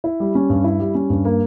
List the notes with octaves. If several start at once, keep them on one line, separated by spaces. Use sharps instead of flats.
E4
G3
C#4
G2
E4
G3
C#4
G2
A#3